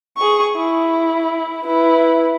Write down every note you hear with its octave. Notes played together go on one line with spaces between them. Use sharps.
G#4 C#6
E4
E4 B4